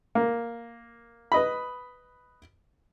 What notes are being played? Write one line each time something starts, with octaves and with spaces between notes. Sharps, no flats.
A#3
B4 D#5 B5